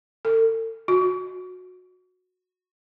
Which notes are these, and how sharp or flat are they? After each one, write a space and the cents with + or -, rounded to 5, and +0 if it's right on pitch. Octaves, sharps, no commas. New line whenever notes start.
A4 +40
F#4 -15